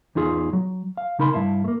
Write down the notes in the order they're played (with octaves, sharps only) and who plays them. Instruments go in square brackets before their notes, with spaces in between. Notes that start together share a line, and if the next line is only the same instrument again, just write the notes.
[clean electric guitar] E2 D#4 F4 G#4
F#3
F5
C#3 D#4 A#4 B5 C6
G2 D#3 E4 F5 A5
A3 A#3